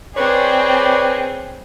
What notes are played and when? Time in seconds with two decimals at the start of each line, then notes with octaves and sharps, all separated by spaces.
0.16 C4 G#4 B4 C#5 D5